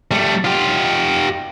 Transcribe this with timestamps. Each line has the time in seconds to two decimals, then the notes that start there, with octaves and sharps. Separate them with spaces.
0.11 G3 A3
0.44 F4 G4